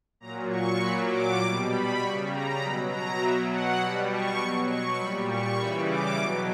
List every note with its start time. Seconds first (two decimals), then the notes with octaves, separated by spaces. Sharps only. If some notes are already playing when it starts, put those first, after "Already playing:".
0.20 A#2 F#3 A#5
0.50 C#6
0.80 A#2 F#3 B5
1.10 D6
1.40 G3 D6
1.45 B2
1.69 B5
1.99 C#3 G3 C#6
2.29 A#5
2.59 B2 F#3 B5
2.89 A#5
3.19 B2 F#3 E5
3.49 F#5
3.78 B2 G3 B5
4.09 C#6
4.38 B2 F#3 C#6
4.68 C#6
4.98 A#2 G3 B5
5.28 C#6
5.58 C#3 E3 G3 B5
5.87 D6
6.17 B2 F#3